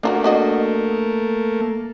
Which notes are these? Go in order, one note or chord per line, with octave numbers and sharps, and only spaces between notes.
A3 A#3 D4 F4 F#4
D4 F#4 D#5